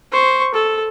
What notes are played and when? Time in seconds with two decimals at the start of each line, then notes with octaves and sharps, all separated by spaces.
0.12 C5 C#6
0.54 A4